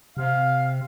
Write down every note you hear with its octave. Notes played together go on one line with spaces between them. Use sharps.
C3 F5